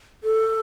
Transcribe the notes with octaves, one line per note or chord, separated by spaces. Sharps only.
A4